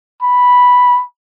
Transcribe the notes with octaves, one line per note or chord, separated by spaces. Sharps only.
B5